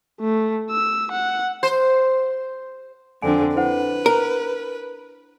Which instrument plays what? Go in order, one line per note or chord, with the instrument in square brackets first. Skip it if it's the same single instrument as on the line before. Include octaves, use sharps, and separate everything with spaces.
[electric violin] A3
E6
F#5
[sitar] C5
[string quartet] F2 D3 C4 [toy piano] D4 G#5
[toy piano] E4 C5 F#5 [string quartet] B4
[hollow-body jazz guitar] A#4